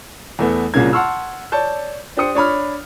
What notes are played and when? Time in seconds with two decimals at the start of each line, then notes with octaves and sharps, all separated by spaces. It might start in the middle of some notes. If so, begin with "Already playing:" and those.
0.39 E2 A3 B3
0.74 C2 A#2 C#3 A#3 C#4 G#6
0.92 F#5 A5 C6 C#6 E6 F6
1.52 C#5 D5 A5 G6
2.17 D4 G4 C5 D#6 C#7
2.35 D4 C#5 B5 F6